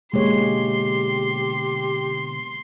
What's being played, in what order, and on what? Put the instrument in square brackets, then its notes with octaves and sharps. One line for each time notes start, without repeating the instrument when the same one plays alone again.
[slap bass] B2 D3 E3 [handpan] G#3 A#3 C#5 [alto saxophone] G4 [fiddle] C6